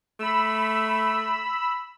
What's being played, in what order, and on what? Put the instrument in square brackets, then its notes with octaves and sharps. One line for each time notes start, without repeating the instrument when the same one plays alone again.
[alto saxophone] A3 [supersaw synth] B5 E6